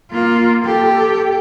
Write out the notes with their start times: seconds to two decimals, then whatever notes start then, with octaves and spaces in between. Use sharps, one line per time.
0.11 A#3 F4
0.65 G4 A4